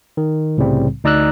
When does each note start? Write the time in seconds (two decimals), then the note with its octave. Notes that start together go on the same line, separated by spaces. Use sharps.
0.17 D#3
0.57 C2 A2 C#3 G3 C4
1.04 D2 D#4 D5 A#5 E6 F#6